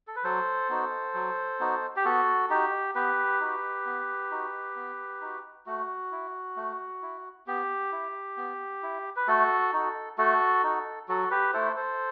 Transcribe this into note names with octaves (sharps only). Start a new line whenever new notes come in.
A4
B4
F#3 A4 C5
B3 D#4 F#4
F#3
B3 D#4 F#4
G4
B3 F#4 A4
D#4 F#4 G4
B3 G4 B4
D#4 F#4
B3
D#4 F#4
B3
D#4 F#4
A3 F#4
E4
A3
E4
B3 G4
E4
B3
E4
B4
A3 F#4 A4
D#4 F#4
A3 F#4 A4
D#4 F#4
F#3 F#4 A4
G4 B4
A3 E4 A4 C5
A4 C5